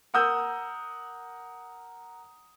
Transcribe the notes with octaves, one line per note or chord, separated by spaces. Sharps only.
A#4 F#5 D#6 E6 G6